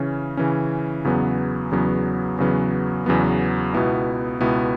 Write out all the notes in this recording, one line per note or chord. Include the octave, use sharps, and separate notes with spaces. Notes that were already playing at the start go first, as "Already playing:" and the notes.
Already playing: C#3 E3 C#4
C#3 E3 C#4
E2 C#3 F#3 B3
E2 C#3 F#3 B3
E2 C#3 F#3 B3
E2 C#3 F#3 B3
C#2 B2 B3 E4
C#2 B2 B3 E4